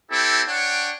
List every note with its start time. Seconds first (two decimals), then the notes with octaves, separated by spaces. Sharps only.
0.11 C4 E4 G4 A4
0.48 D4 C#5 F#5 G5